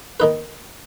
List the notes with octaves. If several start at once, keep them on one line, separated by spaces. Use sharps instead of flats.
D#3 D#4 B4